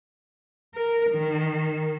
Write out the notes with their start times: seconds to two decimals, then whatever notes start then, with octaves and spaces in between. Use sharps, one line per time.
0.75 A#4
1.11 D#3